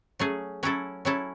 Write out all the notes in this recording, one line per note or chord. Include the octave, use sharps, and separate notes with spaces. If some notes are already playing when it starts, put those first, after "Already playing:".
F#3 A3 C#4 G#4
F#3 C#4 E4 A4
F#3 C#4 E4 A4